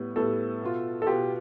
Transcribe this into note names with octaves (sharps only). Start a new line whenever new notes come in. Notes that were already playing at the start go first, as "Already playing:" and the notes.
Already playing: A2 G3 B3
A2 G3 B3 A4
B2 B3 F4
A4
B2 B3 F4 G4